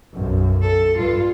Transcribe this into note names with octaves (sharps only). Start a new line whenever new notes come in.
B1 F#2
A4
G2 F4